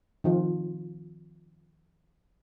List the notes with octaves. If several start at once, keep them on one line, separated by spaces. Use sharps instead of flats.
D#3 F3 F4